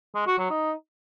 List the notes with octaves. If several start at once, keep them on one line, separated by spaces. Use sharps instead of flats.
G#3
F#4
F#3
D#4